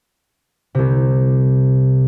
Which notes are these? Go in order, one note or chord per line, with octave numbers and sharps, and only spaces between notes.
C2 C3